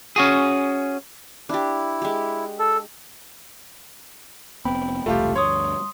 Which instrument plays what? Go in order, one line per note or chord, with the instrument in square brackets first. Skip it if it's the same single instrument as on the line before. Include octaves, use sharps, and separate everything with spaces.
[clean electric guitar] C#4 F#4 G#4
[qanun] D4 G4 [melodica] E4
[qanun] G#3 G4
[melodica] A4
[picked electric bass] F1 B3 C4 [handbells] G5 B5
[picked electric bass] E1 C2 [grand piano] A3 F4 G4
[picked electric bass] D2 G2 [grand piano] C#5 [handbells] C6 D#6